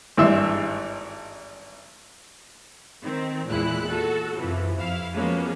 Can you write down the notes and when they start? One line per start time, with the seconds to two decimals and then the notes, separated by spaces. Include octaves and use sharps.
0.17 G#1 G2 E3 E5 C6
3.02 D#3 C4
3.48 E2 A#2 G#3 E4 F#6
3.89 F#4 A4
4.37 F#2 C3 E3 F3
4.75 F2 E4 F5
5.14 F3 F#3 G#3 A#3 B3 C#4